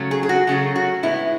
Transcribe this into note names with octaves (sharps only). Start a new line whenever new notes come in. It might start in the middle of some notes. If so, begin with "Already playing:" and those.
Already playing: C#3 F#3 A3 C#4
G#4
G#4
F#4
C#3 F#3 A3 C#4 G#4
F#4
A2 G#3 B3 E4